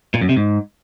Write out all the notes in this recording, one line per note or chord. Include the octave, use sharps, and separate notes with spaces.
A#2
F#2
C3
G#2